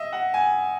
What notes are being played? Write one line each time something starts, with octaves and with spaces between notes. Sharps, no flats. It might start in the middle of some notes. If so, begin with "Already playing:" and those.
Already playing: D#5 E5
F#5
G#5